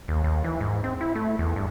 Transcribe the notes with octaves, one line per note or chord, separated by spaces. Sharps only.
D#2
D#2
E3
G#2
C4
E4
A3
E2
G2